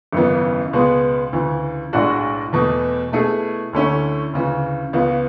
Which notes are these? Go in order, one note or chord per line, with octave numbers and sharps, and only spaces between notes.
G#1 F#2 C#3 E3 B3
C#2 B2 G#3 B3
D2 C#3 E3
B1 A2 G#3 D4 F#4
E2 B2 A3
B2 A3 E4 G#4
D2 D3 A3 C#4 E4
D2 C#3 E3
C#2 C#3 E3 B3